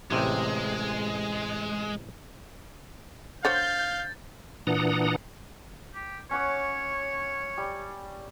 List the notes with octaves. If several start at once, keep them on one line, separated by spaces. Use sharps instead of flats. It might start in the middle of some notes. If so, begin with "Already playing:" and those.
A1 C3 G#3 G5
D3 C5 C#5 F5 G6 A6
A#2 E3 D4 F#5 A#5 D#6
G4
C#4 C#5 F#5 D6
G3